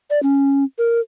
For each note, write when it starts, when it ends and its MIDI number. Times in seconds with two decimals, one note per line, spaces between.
0.10 0.21 74
0.23 0.64 61
0.78 1.00 70